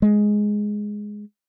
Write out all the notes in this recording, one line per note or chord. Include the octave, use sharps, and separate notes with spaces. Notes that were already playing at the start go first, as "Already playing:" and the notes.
G#3